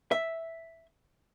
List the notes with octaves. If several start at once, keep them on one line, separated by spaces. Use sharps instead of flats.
E5